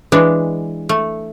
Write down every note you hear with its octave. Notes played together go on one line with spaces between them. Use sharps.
E3 G#3 D4
A3